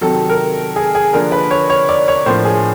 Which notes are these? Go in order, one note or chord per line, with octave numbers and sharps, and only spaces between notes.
C3 D#3 F#3 A4
A#4
G#4
G#4
D3 F3 A#3 D4 A#4
B4
C#5
C#5
D5
C#5
A2 F3 A#3 D4 C5
G#4